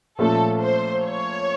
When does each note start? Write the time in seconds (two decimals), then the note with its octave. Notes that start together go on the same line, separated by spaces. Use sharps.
0.19 A#2 F3 A3 C#4 A4
0.61 C5
1.03 C#5